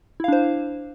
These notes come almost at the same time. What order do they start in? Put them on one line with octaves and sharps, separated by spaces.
E4 F5 D4 C5